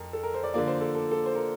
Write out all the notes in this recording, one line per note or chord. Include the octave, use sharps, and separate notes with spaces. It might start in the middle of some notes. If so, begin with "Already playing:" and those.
Already playing: F2 A#4
A4
A#4
C5
D5
D3 F3 A#3 D5
C5
A4
A4
A4
C5
A#4